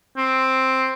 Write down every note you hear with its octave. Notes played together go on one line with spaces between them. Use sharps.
C4